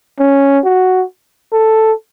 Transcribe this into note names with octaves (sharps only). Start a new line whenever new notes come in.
C#4
F#4
A4